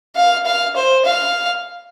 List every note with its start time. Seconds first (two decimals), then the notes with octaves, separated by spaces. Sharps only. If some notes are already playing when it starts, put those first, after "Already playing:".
0.16 F5
0.46 F5
0.76 C5
1.05 F5